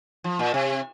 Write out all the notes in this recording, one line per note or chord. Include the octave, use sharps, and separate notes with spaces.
F3
A#2
C3